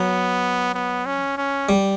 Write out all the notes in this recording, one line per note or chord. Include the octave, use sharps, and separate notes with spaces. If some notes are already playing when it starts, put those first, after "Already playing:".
Already playing: F#3 B3
B3
C#4
C#4
G3